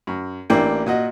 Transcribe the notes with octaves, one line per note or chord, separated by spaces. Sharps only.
F#2
A1 A#3 D4 E4 G5
A#2 F#4 D#5